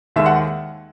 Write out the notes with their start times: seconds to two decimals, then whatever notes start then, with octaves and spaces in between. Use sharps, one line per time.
0.16 D#2 D#3 G#3 E5
0.26 F#5